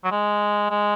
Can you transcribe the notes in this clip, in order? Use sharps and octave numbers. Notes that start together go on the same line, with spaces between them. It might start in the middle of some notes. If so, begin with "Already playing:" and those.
F#3
G#3
G#3